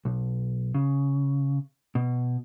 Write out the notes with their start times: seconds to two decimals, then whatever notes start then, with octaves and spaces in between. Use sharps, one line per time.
0.05 B1
0.74 C#3
1.95 B2